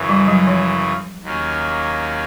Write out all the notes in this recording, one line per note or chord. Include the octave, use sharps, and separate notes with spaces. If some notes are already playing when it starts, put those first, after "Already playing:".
Already playing: F#2 C#3 E3
G3
F#3
F3
D#2 D#3 F#3 A#3 C#4